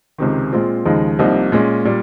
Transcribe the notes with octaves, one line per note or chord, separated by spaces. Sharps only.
C#2 C3 D#3
A#2 G#3 C4 F4
D#2 C#3 F3 G#3 D#4
C2 C3 F3 A#3 D#4
A#2 G#3 C#4
A#2 G3